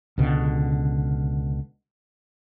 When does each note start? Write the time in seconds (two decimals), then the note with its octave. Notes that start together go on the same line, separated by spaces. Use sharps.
0.18 C#2 B2 D3